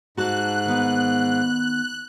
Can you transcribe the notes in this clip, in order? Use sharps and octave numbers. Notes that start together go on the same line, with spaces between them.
G#2 F#4 A5 F#6
D#3 B3